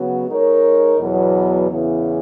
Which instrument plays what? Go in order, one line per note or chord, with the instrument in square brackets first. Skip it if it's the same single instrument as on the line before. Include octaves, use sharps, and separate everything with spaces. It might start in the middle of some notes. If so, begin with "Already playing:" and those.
Already playing: [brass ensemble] C#3 F#3 B3 F#4
G#3 D#4 A#4 C#5
E2 B2 F#3
E2 C#3 E3 B3